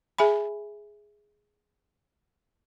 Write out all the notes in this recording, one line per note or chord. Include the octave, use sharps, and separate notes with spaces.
G#4 E5 G#5 B5